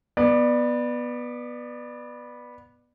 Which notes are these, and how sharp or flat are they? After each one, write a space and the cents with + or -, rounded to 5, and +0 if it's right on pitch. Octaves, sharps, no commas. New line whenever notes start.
B3 -10 D5 +20